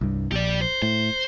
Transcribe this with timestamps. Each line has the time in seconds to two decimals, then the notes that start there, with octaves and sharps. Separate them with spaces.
0.01 C2 G2
0.32 A#1 G4 D5
0.62 C5
0.82 A2 C5